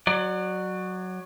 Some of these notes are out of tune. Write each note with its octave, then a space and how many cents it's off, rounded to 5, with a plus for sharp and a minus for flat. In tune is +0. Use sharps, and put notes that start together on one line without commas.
F#3 +0 D5 +35